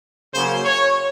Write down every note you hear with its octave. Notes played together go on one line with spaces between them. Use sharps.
C#3 F#3 A#3 C#4 C5
C#5